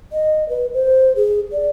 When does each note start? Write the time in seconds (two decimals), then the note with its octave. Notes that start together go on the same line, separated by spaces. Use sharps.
0.12 D#5
0.49 B4
0.74 C5
1.16 G#4
1.52 D5